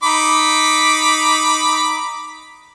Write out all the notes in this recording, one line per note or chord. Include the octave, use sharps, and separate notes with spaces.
D#4 B5 D6